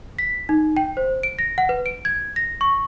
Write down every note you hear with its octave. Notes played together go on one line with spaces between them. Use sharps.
B6
D#4
G5
C5
D7
A#6
F#5
B4
D7
G#6
A#6
C#6